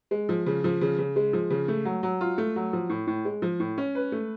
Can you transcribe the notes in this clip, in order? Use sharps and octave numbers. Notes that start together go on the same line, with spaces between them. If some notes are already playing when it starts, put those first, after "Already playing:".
G#3
F3
C#3
F3
C#3
C#3
G#3
F3
C#3
A3
F#3
F#3
F4
A3
F#3
F3
A2
A2
G#3
F3
A2
C#4
B4
A3